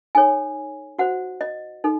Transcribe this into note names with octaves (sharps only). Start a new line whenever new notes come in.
D#4 A4 C#5 G#5
F#4 C5 F#5
D#5
D#4 A4